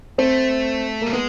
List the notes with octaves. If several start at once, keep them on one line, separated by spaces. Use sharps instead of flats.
A3 C4
G3 A#3
G#3 B3